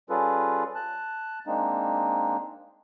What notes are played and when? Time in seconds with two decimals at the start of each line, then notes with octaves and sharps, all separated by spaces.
0.10 G3 C#4 F4 G#4 A4 B4
0.75 A5 F#6
1.47 G#3 A#3 C4 D4 D#4